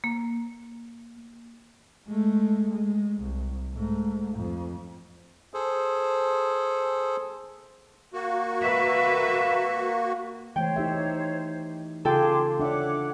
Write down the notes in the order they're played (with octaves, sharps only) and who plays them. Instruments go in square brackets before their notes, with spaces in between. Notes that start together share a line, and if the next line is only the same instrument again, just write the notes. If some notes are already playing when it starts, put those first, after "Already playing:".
[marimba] A#3
[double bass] G#3 A3
G#3
C2
G#2 A3
F2
[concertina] G#4 A4 C5
[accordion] A#3 F#4
[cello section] B4 E5
[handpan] E3 A3 [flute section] C5 C#5 [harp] G5
[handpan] D#4 G4 E5
[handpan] C#3 F4 [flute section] G#4 C6 D6 [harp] A4 G5
[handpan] D4 E5 [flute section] C#5 F#5 D6